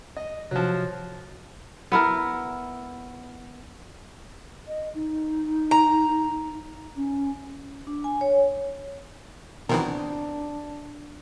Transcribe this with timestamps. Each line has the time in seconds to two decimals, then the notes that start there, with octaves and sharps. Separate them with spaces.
0.17 D#5
0.51 C3 F3 F#3
1.92 B3 E4 A#4
4.67 D#5
4.95 D#4
5.71 A#5
6.96 C#4
7.87 D4
8.04 G#5
8.21 C#5
9.69 B2 D#3 E3 B3 C4 D4 A#4